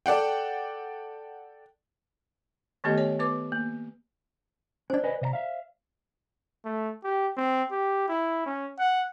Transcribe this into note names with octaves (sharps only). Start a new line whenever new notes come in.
A4 D5 F#5 G5
D#3 A3 B3 G4 A4 D#5
C#5 G#5
B3 B4 D6
A#3
C#4 D4 C5 D5
B4 D#5 G#5
C3 D#5 A#5
E5 F5
A3
G4
C4
G4
E4
C#4
F#5